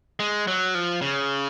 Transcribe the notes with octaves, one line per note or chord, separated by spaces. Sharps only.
G#3
F#3
F3
C#3